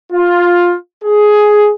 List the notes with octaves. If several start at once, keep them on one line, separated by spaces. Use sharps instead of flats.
F4
G#4